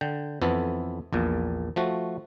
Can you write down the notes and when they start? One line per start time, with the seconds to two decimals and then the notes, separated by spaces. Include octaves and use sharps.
0.01 D3 G5
0.42 F2 E3 B3 A4
1.13 A#1 E2 A#2
1.76 F3 A3 F#4